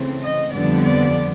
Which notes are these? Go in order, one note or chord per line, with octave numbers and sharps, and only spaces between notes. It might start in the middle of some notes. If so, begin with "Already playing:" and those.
Already playing: C#3 E3 A3 C4
D#5
F2 D3 G3 B3 D5
D5